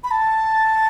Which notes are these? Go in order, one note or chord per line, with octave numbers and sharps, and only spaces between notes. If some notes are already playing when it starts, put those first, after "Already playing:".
B5
A5